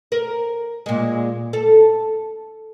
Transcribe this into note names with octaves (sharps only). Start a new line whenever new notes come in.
A#4
A#2 G#3
A4